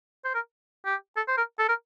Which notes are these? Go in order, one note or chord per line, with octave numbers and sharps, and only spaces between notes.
C5
A#4
G4
A4
C5
A#4
A4
A#4